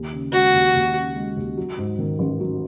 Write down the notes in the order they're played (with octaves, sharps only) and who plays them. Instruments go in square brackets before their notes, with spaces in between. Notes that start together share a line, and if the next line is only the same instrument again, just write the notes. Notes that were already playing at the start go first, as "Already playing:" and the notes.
Already playing: [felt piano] D#2
C#3
[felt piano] G#3 [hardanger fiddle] F#4
[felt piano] D#2
D#2
C#3
G#3
D#2
F#3
G#2
D#3
A1
F#3